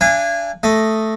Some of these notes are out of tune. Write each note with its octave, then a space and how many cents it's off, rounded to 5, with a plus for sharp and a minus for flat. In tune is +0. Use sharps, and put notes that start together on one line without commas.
D4 +0 F5 -45 G#5 -20
A3 +0 D#5 +0